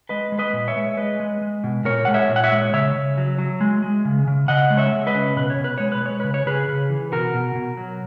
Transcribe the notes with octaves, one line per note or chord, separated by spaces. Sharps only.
G#3 B4 D#5
G#3
B4 D#5
A#2
C#5 E5
G#3
G#3 B4 D#5
G#3
G#3
B2
A#2 A#4 C#5
G#3 F#5
C#5 E5
A#2
F#5
C#5 E5
G#3
C#3 C#5 E5
C#3
F#3
F#3
G#3
G#3
C#3
C#3
C#3 D#5 F#5
G#3
C#5 E5
G#3
B4 D#5
C#3
B2 B4
C#5
B2
B4
G#3 C#5
B4
G#3 C#5
C#3 B4
C#5
C#3 G#4 B4
C#3
E3
B2 F#4 A#4
B2
B2
F#3